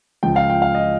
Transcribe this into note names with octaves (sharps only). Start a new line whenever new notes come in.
C#2 C#3 F3 G5
F5
G5
F5
D#5